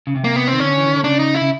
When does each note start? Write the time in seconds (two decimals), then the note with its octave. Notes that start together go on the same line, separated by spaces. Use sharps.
0.07 C#3
0.16 C3
0.24 A#3
0.36 B3
0.48 D#3 C4
0.60 D3 C#4
0.77 E3
0.86 D#3
0.96 D3
1.04 C#3 D4
1.19 D#4
1.34 E4
1.41 C#3